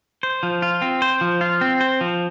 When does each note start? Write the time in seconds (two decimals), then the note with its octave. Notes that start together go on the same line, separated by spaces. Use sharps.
0.23 C5
0.43 F3
0.62 F4
0.82 C4
1.02 C5
1.21 F3
1.41 F4
1.61 C4
1.81 C5
2.01 F3